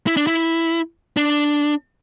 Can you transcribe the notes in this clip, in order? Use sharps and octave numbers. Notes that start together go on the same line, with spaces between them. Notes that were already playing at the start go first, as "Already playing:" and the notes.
E4
D4
E4
D4